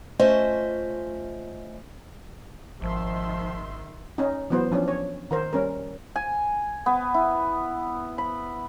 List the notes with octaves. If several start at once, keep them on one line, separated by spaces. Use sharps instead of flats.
A3 C#4 F4 C5 D#5 E5
G#1 D#3 F3 E5 C6
C#4 D#4
E3 F#3 B3 C5
F3 C#4 D4
C#5
D#3 A#4 C5
G3 C#4 A#4
G#5
B3
E4
B5